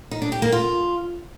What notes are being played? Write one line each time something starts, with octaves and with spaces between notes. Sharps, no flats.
D#4
D4
G4
A#3
F4